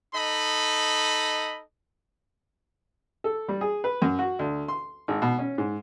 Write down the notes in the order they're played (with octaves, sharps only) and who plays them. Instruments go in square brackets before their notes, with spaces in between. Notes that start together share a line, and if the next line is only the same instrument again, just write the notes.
[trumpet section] D#4 A4 D#5 B5
[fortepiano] A4
G3
G#4
B4
F#2
F#4
D2
C6
G#1
B2
C#4
G#2